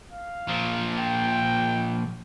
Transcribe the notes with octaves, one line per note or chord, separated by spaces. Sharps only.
F5
A#2 F3
G5